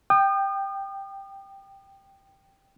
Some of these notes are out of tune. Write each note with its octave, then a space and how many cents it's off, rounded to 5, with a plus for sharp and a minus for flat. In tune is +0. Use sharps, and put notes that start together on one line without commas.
G5 +0 D#6 -40